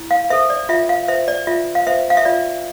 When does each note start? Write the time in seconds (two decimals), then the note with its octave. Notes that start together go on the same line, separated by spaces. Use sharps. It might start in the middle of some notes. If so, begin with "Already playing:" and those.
Already playing: E4
0.11 F5
0.30 A4 C5 E5
0.50 D5
0.69 F4 E5
0.89 F5
1.08 C5 E5
1.28 D5
1.47 F4 E5
1.75 F5
1.87 C5 E5
2.10 F5
2.17 E5
2.25 F4 D5